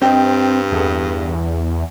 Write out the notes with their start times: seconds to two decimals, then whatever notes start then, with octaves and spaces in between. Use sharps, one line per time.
0.02 G2 C4 G4 D#5
0.72 E2 G#4 A4